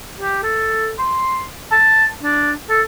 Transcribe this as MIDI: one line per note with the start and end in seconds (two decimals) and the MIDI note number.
0.21 0.40 67
0.43 0.93 69
0.99 1.44 84
1.72 2.07 81
2.23 2.51 62
2.70 2.82 69